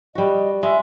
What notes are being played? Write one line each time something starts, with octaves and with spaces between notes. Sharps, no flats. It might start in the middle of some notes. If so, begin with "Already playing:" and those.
G3 F#4 D#5
G#3 E5